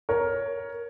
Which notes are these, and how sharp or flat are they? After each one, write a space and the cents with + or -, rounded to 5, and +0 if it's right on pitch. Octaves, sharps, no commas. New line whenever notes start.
A#4 +10 C#5 +10